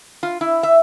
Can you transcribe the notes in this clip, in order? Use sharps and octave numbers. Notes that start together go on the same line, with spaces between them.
F4
E4
E5